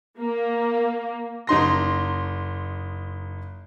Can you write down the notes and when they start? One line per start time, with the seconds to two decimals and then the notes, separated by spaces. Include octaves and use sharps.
0.20 A#3
1.47 F#1 D#4 C6 A#6